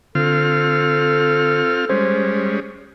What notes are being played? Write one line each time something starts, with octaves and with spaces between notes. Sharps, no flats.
D3 C4 F4 A4 F6
G3 G#3 C#4 C5